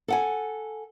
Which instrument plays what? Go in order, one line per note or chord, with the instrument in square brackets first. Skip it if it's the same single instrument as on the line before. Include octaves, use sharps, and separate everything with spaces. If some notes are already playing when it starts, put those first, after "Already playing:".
[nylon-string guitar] A4 F#5 G#5